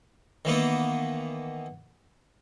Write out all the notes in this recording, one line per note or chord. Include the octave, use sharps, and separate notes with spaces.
D#3 E3 A#3 B3